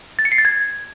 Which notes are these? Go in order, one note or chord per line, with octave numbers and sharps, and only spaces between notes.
A6
C#7
C7
A6
G#6